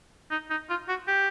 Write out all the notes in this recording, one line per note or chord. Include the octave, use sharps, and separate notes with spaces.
D#4
D#4
F4
F#4
G4